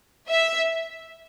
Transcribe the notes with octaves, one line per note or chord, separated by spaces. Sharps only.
E5